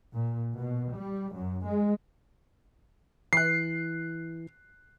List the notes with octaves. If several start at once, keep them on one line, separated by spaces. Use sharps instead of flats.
A#2
B2
G3
F#2
G#3
E3 F#6 C7